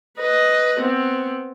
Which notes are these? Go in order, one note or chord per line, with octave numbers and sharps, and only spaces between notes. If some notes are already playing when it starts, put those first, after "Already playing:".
B4 D#5
B3 C4